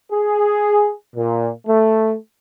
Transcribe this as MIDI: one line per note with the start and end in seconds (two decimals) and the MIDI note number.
0.11 0.91 68
1.16 1.49 46
1.67 2.15 57